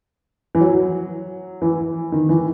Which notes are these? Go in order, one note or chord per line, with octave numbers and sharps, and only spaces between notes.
E3
F#3
E3
D#3
E3